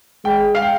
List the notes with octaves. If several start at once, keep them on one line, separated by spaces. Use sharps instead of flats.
G#3 G5
F5
G5